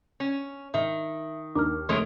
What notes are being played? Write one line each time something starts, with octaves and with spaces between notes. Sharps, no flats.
C#4
G#2 D#3 E5
D#2 D4 D#4 A#4 D6 F6
F1 D#3 G#3 A3 C#5 D7